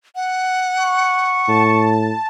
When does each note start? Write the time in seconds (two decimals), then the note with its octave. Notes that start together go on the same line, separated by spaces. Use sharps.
0.16 F#5
0.80 C#6
1.48 A2 A5